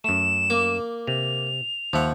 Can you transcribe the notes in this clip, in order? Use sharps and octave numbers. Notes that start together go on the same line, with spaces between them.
F#2 A3 E7
A#3 D6
C3 F7
D#2 F3 E5 F#5